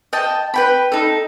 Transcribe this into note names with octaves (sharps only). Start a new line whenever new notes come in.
D#5 G5 A5
B4 G5 B5
D#4 A4